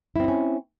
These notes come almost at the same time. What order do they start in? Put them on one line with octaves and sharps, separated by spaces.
E4 C4 D#4 C#4